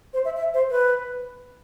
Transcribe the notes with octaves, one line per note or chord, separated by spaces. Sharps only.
C5
E5
E5
C5
B4